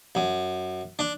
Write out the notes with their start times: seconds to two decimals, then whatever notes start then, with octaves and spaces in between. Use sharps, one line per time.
0.15 F#2
0.99 D4